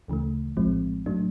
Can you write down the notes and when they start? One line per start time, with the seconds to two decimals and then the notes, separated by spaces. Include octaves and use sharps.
0.08 D2 C#3 E3 A3
0.57 A#1 A2 F3 G#3 C4
1.06 A2 F#3 A3 D4